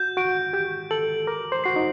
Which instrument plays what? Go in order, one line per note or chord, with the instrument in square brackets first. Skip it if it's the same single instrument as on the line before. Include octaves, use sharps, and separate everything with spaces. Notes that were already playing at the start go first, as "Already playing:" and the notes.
Already playing: [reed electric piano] F#4 [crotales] G6
[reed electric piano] F#4 [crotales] D7
[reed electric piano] G4 [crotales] G6
[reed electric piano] A4 [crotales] F#7
[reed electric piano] A#4 [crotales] D6
[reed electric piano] C5
[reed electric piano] F#4 [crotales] C7
[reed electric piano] D#4